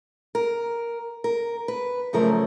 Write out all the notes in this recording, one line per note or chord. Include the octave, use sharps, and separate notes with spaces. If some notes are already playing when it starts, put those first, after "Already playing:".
A#4
A#4
B4
F#2 C#3 F3 A3 A#4